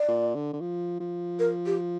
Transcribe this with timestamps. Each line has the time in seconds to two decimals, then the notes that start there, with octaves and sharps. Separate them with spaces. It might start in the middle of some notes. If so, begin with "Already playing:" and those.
Already playing: D5
0.08 A#2
0.35 D3
0.53 D3
0.61 F3
1.00 F3
1.39 A#4
1.66 G4